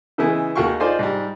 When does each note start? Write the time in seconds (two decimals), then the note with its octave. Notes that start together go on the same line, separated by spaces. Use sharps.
0.18 C#3 E3 G#3 B3 E4
0.55 D#2 G#3 F#4 F5 G5 C#6
0.80 D#4 F4 G#4 C5 D5
0.99 G#2 G3